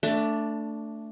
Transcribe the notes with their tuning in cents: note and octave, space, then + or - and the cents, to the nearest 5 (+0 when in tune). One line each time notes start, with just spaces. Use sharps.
A3 +15 D4 -5 B4 +0